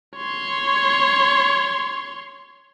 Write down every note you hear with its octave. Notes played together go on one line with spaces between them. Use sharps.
C#5 C6